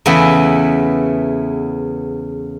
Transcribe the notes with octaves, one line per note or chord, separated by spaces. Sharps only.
E2 C#3 A3 B3 E4 A4